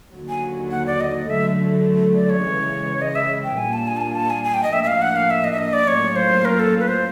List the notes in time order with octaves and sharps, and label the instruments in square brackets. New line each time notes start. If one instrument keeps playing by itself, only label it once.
[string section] D#2 D3 F#3
[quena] G#5
F#5
D5
D#5
[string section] D3 F#3 A3 [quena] E5
[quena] D5
C#5
[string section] C#3 E3 G#3
[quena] D#5
E5
G5
[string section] A#2 G3 A#3 D4 F4 [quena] G#5
[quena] A5
G#5
A5
G#5
A5
G#5
G#5
G5
D#5
[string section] A2 F3 A#3 D4 [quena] E5
[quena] E5
F5
F#5
F5
E5
D#5
E5
D#5
D5
[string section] A2 F#3 A#3 C#4 F4 [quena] C#5
[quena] C5
A#4
A4
B4
C5